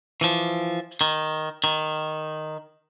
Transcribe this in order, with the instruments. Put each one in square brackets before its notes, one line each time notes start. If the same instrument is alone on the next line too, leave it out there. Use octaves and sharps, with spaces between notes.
[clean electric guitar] E3 F3
D#3
D#3